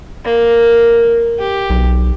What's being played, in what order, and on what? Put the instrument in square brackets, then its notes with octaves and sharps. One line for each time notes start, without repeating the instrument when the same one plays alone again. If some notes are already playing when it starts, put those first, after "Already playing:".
[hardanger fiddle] A#3
G4
[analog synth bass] B1